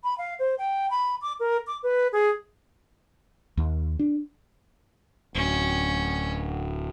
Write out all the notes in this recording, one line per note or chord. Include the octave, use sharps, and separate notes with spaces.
B5
F5
C5
G5
B5
D6
A#4
D6
B4
G#4
D#2
D4
D1 C#4